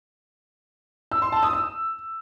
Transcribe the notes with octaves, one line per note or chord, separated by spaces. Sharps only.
E6
C6
A5
D#6
E6